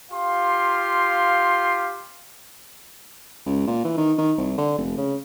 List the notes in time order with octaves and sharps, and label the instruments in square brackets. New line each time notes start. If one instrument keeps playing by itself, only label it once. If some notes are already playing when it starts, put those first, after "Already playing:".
[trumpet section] F4 G4 F5 C6
[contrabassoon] C#2
A#2
E3
D#3
D#3
C2
D3
F1
C#3